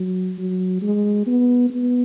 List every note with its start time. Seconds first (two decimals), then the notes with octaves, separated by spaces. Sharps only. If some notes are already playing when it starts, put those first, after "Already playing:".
Already playing: F#3
0.38 F#3
0.82 G#3
1.27 B3
1.70 B3